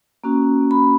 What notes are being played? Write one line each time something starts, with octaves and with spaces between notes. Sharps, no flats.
A#3 C#4 F#4
B5